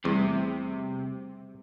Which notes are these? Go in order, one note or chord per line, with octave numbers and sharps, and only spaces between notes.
E2 C3 G3 A3